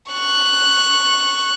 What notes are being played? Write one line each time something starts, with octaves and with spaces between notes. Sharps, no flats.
C#6 F#6